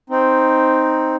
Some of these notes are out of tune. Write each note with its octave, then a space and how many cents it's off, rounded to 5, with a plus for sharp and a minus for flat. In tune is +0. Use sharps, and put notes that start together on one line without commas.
C4 +0 D#4 +0